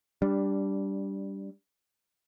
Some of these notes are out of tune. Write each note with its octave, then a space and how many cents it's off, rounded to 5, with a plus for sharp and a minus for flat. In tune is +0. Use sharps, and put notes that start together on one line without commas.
G3 +0 D4 -10